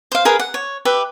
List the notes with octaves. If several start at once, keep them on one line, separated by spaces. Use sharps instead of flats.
C5 F5
G#4 A#4 B4 F5
F#5
C#5
G4 B4 E5